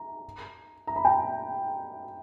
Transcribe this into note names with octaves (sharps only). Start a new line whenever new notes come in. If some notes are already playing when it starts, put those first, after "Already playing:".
Already playing: A#5
A#5
B5
G5 A#5